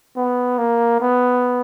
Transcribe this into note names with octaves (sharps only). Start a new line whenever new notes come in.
B3
A#3
B3